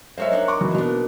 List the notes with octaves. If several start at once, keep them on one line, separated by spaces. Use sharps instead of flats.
F#3 G#3 A#4 C5 C#5 E5
D4 D#4 F#5
C#6 D6
E3 F#3
B2 A#3 D4